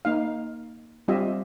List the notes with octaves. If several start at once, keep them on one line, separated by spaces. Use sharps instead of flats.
A#3 D#4 F5
G3 C4 F4 G4 D#5 E5